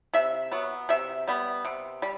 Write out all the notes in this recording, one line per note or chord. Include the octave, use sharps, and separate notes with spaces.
C3 E5
F#3 B3
C3 E5
G3 B3
C3
G3